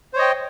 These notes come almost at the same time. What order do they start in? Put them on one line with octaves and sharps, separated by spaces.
C5 C#5 D#5 G5